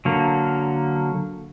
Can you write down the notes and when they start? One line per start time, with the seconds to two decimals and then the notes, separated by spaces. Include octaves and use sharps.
0.05 D3 F#3 A#3